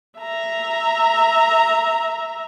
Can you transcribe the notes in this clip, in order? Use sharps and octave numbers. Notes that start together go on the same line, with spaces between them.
E5 A#5